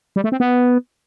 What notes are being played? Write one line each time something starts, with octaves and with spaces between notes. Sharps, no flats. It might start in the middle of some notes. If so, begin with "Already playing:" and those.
G3
A3
C4
B3